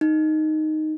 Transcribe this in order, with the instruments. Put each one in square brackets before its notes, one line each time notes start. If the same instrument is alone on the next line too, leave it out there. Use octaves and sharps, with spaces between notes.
[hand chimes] D#4